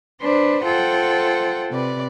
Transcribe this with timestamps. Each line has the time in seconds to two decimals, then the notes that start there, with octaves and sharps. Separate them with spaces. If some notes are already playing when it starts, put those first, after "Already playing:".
0.21 D4 B4 C5
0.64 F4 A4 C5 F#5 G5
1.70 C3 B4 D5